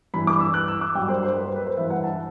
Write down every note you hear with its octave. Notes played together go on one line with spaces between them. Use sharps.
G2 E3 B5
D6
E6
F#6
E6
D6
G2 F#3 G5
C5
C5
B4
C5
B4
C5
G2 E3 E5
F#5
A5